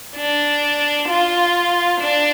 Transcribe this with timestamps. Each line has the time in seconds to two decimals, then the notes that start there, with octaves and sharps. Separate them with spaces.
0.16 D4
1.08 F4
2.01 D4